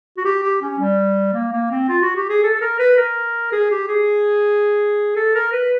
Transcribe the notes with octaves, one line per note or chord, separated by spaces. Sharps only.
F#4
G4
G4
C#4
G3
A#3
A#3
C4
F4
F#4
G4
G#4
A4
A4
A#4
B4
A#4
G#4
G4
G#4
A4
A#4
B4